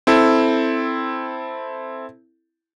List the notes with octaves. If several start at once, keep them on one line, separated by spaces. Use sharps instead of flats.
C4 E4 A4